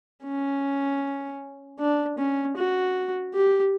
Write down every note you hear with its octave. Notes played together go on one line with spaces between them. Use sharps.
C#4
D4
C#4
F#4
G4